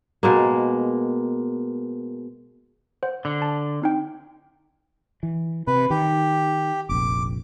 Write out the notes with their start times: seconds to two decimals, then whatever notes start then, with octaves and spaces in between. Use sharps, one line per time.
0.23 B2 G#3 A#3
3.03 C5 F#5
3.25 D3
3.42 A5
3.82 C4 D#4 G5
5.23 E3
5.67 C3 B4
5.90 D#3 G4
6.89 F1 A#1 D6